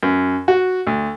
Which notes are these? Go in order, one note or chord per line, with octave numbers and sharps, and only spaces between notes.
F#2
F#4
D2